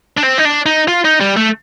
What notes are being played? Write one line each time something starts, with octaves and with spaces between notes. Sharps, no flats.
D4
C4
D#4
D4
D#4
F4
D#4
G3
A3